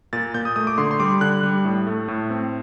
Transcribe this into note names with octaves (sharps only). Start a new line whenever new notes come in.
A#2 A6
A#2 G6
D#6
A3 D#6
D6
D3 C6
C6
G3 D6
D3 F#6
G3
A2
A3
A2
C4